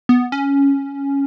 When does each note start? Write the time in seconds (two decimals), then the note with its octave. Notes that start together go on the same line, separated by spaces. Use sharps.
0.09 B3
0.32 C#4